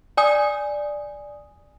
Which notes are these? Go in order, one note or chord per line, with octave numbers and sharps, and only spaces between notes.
D5 G#5 D#6